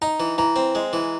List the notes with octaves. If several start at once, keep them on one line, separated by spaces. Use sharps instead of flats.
D#4 A#5
E3
E3 A#5
C4
G#3
E3